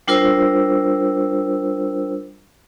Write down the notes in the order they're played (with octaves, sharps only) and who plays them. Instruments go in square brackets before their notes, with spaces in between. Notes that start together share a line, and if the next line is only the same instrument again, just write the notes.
[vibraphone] G3 D4 F4 A#4 C5 E6